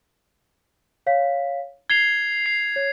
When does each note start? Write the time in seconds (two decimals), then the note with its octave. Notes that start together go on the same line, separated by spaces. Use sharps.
1.07 C#5 F5 B6
1.90 G#6 C7 F7 G7
2.46 C7
2.76 C#5